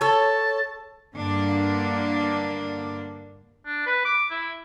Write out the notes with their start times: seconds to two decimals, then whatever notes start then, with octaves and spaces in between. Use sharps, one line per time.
0.01 A4 C#5 A5
1.15 G2 D3 A#3 D4
3.66 D4
3.86 B4
4.05 D6
4.31 E4